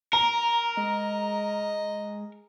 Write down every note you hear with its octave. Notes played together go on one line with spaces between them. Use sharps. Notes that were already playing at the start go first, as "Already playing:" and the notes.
A#4 A#5
G#3 D#5